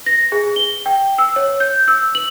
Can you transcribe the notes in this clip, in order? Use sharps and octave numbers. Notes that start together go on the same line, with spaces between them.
A#6
G#4
G7
G5
E6
C#5
G6
E6
F#7